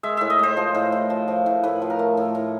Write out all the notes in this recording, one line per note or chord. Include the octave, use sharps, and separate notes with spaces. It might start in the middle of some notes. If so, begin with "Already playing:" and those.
G#3 E5
A2 E5
D#5
G#3 C5
F3
A2
A2
F3
F3
A2
A2 B4
F3
A#4
A3
A2
A2